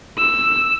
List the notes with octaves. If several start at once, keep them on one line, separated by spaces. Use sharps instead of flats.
E6